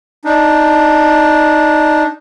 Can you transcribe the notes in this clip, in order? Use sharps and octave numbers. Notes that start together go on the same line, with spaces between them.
D4 D#4